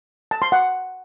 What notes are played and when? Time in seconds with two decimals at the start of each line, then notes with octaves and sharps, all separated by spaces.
0.31 A5
0.42 C6
0.52 F#5